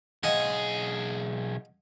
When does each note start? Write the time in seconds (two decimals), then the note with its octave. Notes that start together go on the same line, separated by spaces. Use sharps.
0.23 B1 G#4 D#5 F5 F#5